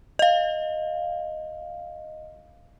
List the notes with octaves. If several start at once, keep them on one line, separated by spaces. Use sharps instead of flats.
D#5 F5